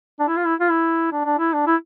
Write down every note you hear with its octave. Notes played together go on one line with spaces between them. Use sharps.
D4
E4
F4
E4
F4
E4
D4
D4
E4
D4
E4